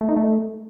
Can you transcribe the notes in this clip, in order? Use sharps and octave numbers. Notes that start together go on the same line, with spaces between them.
A3
D#4
A3